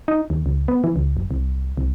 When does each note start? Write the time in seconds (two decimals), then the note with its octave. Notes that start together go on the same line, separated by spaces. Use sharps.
0.08 D#4
0.30 D#2
0.46 C#2
0.68 B3
0.84 E3
0.96 C#2
1.17 F#1
1.31 C2
1.77 C2